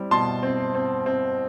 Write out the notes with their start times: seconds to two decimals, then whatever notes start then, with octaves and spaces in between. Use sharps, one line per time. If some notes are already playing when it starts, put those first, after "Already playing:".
Already playing: G3 C4 E4
0.11 B2 A5 C6
0.43 C4
0.75 C4
1.06 C4